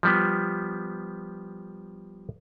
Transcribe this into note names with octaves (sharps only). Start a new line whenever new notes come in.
F3 G3 B3